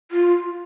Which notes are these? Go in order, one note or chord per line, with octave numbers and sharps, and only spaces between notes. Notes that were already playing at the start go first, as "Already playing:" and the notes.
F4